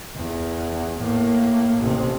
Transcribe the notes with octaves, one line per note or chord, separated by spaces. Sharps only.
E2
A2 A#3
A1 C3